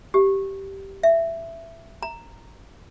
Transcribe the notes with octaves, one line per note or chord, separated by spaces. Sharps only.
G4
E5
A#5